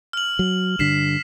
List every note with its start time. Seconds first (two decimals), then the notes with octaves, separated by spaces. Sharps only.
0.13 F6 F#7
0.39 F#3
0.79 G2 D3 B6 C7 E7